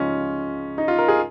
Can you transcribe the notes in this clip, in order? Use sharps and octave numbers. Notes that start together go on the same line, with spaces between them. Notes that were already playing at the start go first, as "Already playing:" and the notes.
Already playing: C#2 C#3 F3 C#4 D#4 F4
D#4
F4
A#4
G#4